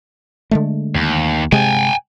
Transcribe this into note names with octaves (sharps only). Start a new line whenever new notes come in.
D3 G#3 A3
D#2
C3 G#3 G5 G#5